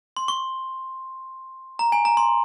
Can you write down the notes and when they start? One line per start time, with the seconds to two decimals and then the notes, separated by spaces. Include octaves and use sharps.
0.17 C6
0.28 C#6
1.79 A#5
1.92 G#5
2.05 A#5
2.17 C6